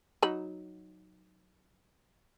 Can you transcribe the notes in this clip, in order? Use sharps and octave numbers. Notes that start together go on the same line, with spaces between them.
F#3 D#4 B5